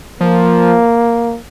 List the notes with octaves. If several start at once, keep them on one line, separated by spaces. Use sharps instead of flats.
F3 A#3